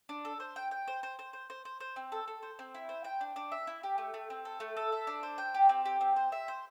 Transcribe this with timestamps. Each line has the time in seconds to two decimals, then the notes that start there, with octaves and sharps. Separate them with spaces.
0.09 D4
0.25 A4
0.40 C5
0.56 G5
0.71 G5
0.88 C5
1.03 C5
1.19 C5
1.33 C5
1.50 C5
1.65 C5
1.80 C5
1.96 C4
2.12 A4
2.28 A4
2.43 C5
2.59 C4
2.75 E4
2.89 C5
3.04 G5
3.21 D4
3.36 D4
3.52 E5
3.67 E4
3.83 G4
3.98 A3
4.14 A3
4.30 C4
4.45 A4
4.60 A3
4.77 A4
4.92 E5
5.07 D4
5.23 C5
5.38 G5
5.54 G4
5.69 C4
5.85 G4
6.01 C4
6.16 C5
6.32 E5
6.48 C5